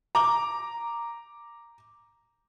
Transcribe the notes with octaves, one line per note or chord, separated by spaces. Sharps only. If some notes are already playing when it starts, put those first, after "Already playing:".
A#5 D6